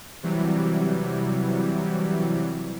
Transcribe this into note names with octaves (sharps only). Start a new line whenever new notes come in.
C3 E3 F#3 G3